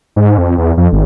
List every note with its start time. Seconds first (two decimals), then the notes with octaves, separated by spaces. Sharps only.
0.16 G#2
0.38 F2
0.58 E2
0.77 F2
0.92 G#1